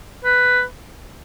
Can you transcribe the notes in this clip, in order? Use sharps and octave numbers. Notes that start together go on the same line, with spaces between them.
B4